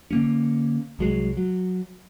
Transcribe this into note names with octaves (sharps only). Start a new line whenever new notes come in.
D3 A#3 C#4
C2 F#3 G#3
F#3